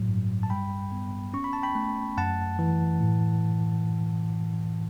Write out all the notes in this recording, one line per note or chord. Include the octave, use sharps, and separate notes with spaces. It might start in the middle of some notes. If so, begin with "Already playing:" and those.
Already playing: A2 F#3
G2
A5
G3 G5 B5
B3
C#4 C#6
B5
A5
G5 B5
A3
F#2 F#5 A5
E3
A2